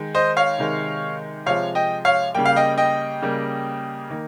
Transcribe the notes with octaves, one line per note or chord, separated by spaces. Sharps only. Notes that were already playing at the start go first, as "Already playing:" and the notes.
Already playing: D#3 G#3
C5 D#5
C#5 F5
C3 D#3 G#3
C3 F3 G#3 C#5 F5
D#5 G5
C#5 F5
C#3 G3 A#3 G5
F5
D#5 G5
D#5 G5
C#3 G3 A#3
D#3 A#3